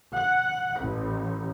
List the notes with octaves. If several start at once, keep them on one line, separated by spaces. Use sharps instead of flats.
F#5
A1